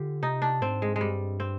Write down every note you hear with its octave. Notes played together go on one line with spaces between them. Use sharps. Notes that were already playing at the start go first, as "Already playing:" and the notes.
Already playing: D3 F4 G4
C3 D#4
D4
G#2 C4
G#3
G#3
G2 G3
C4